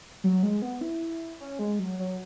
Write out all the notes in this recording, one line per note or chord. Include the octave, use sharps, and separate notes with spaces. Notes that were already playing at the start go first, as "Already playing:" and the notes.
F#3
G#3
B3
E4
C#4
G#3
F#3
F#3